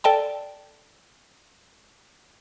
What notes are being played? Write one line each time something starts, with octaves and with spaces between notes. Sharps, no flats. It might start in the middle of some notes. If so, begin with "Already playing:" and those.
A4 D5 G5 A5